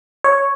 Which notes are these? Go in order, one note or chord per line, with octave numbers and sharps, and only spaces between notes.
C#5